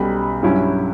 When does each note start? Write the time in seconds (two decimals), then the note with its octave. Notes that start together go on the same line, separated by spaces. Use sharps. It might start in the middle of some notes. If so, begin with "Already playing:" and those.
Already playing: B1 B2 G3 C#4 B5
0.42 G2 F#3 C#4 E4